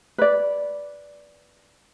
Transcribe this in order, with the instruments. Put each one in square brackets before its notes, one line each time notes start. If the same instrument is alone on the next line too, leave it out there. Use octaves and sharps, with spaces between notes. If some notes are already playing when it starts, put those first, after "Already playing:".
[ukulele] B4 D5